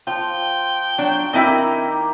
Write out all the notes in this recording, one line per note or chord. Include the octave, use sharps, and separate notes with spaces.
F3 F4 G5
F#3 D4
D#3 A#3 C4 D#4 E4 G4